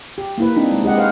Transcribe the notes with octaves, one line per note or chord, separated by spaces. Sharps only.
G4
A#3 E4 B4
C4 D4 D#4
G#3
G#3 G4 D#5 F#5
G4 B4 C5 F5 F#5